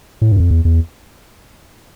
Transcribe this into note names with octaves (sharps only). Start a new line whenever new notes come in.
A2
G2
F#2
F2
E2
E2